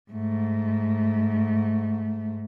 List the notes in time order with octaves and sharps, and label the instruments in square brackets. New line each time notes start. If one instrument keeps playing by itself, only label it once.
[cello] G#2 A3